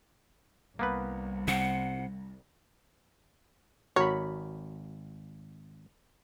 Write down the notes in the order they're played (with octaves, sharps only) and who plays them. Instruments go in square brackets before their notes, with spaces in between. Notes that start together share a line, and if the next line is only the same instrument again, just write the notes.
[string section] C2 [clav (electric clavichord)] A#3 B3 B4
[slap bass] C3 [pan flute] F#5
[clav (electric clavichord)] G#1 A#4 [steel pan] F#4 B5 [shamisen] C#5